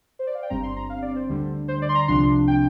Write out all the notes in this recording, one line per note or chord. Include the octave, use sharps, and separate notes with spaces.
C5
D5
F5
G5
G1 G2 G3 C4 A#5
C6
A#5
F5
D5
C5
D2 D3 G3
C5
D5
C6
A#5
C2 C3 F3 D4 C6
G5